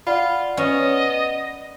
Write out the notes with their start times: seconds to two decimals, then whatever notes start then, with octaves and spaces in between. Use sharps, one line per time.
0.07 F4 D5 F#5 B5
0.57 B3 C#4 D#5